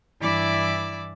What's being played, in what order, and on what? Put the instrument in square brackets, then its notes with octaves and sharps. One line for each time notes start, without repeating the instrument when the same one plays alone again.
[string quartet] G2 E3 E4 D5 D6 E6